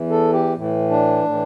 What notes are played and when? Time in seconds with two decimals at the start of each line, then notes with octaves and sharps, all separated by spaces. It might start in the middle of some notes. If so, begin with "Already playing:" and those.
Already playing: E2 E3
0.10 A4
0.32 G4
0.55 A2 E3
0.90 D4
1.25 A2 E3